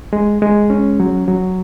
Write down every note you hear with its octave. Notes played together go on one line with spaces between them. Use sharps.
G#3
G#3
C#4
F#3
F#3